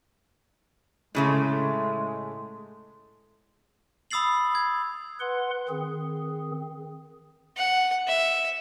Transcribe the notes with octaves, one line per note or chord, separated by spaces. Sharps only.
A2 C#3 G#3 A3
B5 D#6 E6 A6 C7 F#7
G#6
B4 F#5 C6
D#3 C4 G#4
F#5
E5